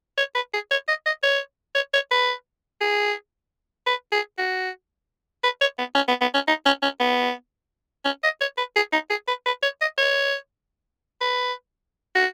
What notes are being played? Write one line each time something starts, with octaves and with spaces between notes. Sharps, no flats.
C#5
B4
G#4
C#5
D#5
D#5
C#5
C#5
C#5
B4
G#4
B4
G#4
F#4
B4
C#5
B3
C#4
B3
B3
C#4
D#4
C#4
C#4
B3
C#4
D#5
C#5
B4
G#4
D#4
G#4
B4
B4
C#5
D#5
C#5
B4
F#4